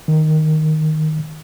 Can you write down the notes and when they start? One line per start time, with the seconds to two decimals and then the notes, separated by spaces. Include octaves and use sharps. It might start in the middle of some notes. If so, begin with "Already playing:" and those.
0.08 D#3